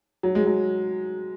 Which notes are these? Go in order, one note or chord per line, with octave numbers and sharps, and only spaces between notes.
F#3
G#3
F#3